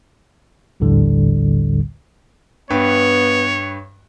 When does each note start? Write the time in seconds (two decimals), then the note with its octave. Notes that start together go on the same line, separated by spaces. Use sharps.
0.80 A#1 D#2 A2 D3 G3
2.70 G2 B3 B4 C#5 G5